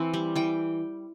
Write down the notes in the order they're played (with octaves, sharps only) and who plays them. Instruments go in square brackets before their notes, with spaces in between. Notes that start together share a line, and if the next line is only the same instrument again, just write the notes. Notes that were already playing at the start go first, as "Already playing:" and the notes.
Already playing: [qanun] E3 C4
G3
E3 G5